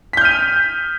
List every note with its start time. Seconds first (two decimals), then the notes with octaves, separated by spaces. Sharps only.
0.13 B6
0.17 G6
0.21 F6
0.25 D#7